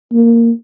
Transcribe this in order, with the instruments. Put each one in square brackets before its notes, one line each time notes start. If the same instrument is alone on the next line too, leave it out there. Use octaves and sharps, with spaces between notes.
[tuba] A#3